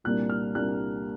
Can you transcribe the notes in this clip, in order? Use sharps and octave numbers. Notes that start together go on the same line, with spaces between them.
C2 A#2 G3 A#3 D4 F#6
F6
C2 A#2 G3 A#3 D4 F#6